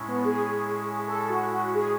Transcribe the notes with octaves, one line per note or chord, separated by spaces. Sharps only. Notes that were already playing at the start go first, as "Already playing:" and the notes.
Already playing: A2 G#3 C#4 E4
B3
G#4
A4
F#4
F#4
G#4